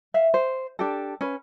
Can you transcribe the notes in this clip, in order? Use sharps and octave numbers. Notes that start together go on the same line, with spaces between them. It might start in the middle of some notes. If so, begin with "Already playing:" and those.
E5 F5
C5
D4 G4 A4
C#4 B4